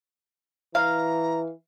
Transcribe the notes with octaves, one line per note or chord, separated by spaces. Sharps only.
E3 F5 A#5